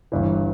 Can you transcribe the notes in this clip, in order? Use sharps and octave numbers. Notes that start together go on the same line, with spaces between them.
G1 G2 E3